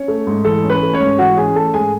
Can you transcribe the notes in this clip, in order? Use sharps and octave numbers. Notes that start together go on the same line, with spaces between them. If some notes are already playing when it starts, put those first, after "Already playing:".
Already playing: C#4 C#5
A3
G#2
E3 A4
C#4
B4
A3
C#4 C#5
G#2
E3 F#4 F#5
C#4 G#4 G#5
A3 A4 A5
G#2 G#4 G#5